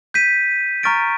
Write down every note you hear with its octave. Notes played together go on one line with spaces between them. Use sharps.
G6 B6 D#7
A#5 C#6 F6 A6 D7